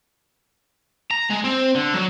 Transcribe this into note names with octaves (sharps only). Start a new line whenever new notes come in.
A#5
G#3
C4
D3
F#3